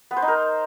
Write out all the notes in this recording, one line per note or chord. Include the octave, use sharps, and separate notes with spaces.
B3
C5
D#4
A#4